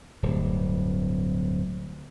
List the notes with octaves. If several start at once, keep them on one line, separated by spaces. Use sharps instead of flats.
D1 G2